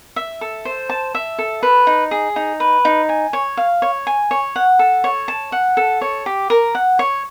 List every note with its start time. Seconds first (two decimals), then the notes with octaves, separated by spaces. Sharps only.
0.16 E5
0.41 A4
0.65 C5
0.90 A5
1.15 E5
1.39 A4
1.63 B4
1.87 D#4
2.11 G#4
2.36 D#4
2.60 B4
2.85 D#4
3.09 G#5
3.33 C#5
3.57 F5
3.82 C#5
4.07 G#5
4.31 C#5
4.56 F#5
4.79 A4
5.04 C#5
5.28 A5
5.52 F#5
5.77 A4
6.01 C#5
6.26 G4
6.50 A#4
6.75 F#5
6.99 C#5